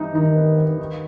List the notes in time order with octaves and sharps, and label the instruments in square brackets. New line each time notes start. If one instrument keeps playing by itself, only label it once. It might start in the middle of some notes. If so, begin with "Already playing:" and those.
Already playing: [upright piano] G2 E3 D#4
[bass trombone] D#3 [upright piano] D#4
[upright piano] B3
B3
D#3